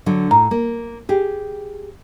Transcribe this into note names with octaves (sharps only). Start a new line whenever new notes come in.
D3 F#3 D4
A2 A#5
A#3
G4 G#4